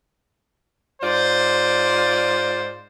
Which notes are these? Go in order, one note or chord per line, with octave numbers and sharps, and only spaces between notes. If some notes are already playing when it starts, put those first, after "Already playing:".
G#2 F4 C5 D5